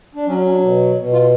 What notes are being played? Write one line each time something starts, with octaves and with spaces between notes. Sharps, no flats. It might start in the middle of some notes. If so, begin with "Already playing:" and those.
D4
F#3 C#4
C#4
D4
B2
B2
F4